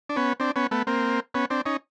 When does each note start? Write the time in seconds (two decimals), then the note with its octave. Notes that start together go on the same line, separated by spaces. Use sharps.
0.09 D4
0.16 B3 C#4
0.40 C4 D4
0.56 B3 C#4
0.71 A3 B3
0.87 A#3 C4
1.34 B3 C#4
1.50 C4 D4
1.66 C#4 D#4